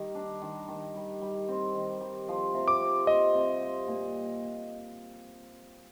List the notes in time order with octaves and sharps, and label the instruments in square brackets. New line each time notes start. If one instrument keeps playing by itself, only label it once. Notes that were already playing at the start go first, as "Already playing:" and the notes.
Already playing: [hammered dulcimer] D#3 G3
D4
D#3
D#3
G3
G3
C4
D#3
G3
F3
C3
[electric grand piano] D6
[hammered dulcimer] C4
[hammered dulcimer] C4 [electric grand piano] D#5
[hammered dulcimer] C3
C4
A#2